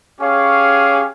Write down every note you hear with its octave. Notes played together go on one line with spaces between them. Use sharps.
C#4 G4 G#4 C#5 F5